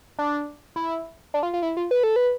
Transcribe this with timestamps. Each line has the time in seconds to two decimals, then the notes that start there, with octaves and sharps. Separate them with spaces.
0.19 D4
0.76 E4
1.34 D4
1.43 F4
1.53 F4
1.62 E4
1.77 F4
1.91 B4
2.03 A4
2.16 B4